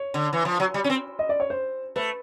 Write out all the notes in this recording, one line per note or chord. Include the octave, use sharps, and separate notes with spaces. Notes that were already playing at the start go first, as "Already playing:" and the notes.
Already playing: C#5
D3
E3
F3
F#3
G3
C#4
C4
D#5
D5
C#5
C5
A3 B4